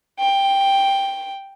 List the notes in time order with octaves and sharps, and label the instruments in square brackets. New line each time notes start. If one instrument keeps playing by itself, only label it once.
[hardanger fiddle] G5